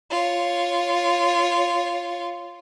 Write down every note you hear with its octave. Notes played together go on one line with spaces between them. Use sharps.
F4 C#5